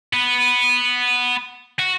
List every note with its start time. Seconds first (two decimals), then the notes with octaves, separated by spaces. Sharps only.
0.13 B3
1.79 F#4